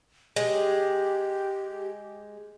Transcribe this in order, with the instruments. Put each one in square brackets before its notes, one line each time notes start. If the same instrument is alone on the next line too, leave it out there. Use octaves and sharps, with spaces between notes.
[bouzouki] G#3 [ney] G4